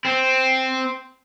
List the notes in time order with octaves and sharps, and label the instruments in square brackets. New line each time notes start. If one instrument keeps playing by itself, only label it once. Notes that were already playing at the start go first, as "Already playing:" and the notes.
[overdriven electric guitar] C4